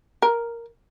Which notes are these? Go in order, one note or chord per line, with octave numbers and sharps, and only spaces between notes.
A#4